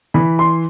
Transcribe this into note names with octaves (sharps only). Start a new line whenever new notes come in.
E3 B5
C6